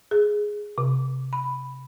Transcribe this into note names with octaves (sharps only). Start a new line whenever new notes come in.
G#4
C3
B5